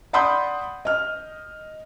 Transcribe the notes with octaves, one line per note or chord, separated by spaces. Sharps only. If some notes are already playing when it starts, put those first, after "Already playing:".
D5 F#5 B5 C6 D#6 G6
D#5 F6